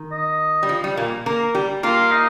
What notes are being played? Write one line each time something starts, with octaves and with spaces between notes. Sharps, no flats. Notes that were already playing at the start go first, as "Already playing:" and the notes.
Already playing: D#3
D#5
G3
F3
G3
A#2 A#3
A#3 A#4
G3 G4
A#3 F4 A#4
D#4